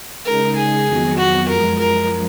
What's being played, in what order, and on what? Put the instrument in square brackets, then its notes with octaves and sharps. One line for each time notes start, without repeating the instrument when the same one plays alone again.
[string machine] C#3 G#3 D#4 [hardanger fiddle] A#4
[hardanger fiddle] G#4
[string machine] F2 D#3 F#3 B3 F#4
[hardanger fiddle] F#4
[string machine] F#2 F3 G#3 [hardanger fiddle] A#4
[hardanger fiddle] A#4